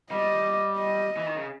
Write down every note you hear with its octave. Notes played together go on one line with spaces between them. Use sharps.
G3 D#5
D#5
E3
D#3
C#3